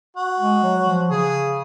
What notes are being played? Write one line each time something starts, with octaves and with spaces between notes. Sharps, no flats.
F#4
G#3
F#3
F3
C#3 G#4